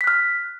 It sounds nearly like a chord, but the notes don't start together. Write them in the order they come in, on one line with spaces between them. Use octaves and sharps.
B6 F#6 F6